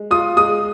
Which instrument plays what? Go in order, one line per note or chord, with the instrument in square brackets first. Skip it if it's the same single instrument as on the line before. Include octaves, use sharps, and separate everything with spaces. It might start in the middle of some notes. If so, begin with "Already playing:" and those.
Already playing: [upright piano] G#3
F4 D#6
G#3 D#6